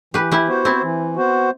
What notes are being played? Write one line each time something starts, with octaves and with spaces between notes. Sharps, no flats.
E3 G4 B4
E4 G4
B3 F#4 C5
C4 E4
E3
B3 F#4 C5